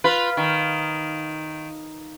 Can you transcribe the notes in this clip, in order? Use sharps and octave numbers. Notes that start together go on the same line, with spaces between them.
F4 B4
D#3